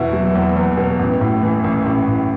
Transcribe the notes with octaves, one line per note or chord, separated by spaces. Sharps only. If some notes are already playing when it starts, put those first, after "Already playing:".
Already playing: E2 B2 E4
F#3
E2
E2
B2
A1
A2
E3
A1
A1
A2